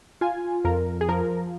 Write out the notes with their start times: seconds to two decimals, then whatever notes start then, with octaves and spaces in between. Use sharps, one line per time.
0.21 F4 G#5
0.65 F2 A#4
1.01 G#4
1.09 F3 A#4